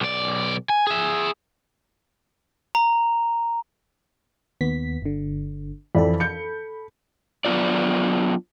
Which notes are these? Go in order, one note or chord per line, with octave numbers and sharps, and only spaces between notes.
B1 D5
G#5
G#4 E5
A#5
D#2 B3 B6
G1 D3
F2 E3 A4 D5 B5
G6 C#7
F#3 B3 D4 F4 D5